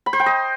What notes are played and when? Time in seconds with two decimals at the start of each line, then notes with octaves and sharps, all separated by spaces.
0.06 B5
0.13 C5
0.20 G5
0.26 D#5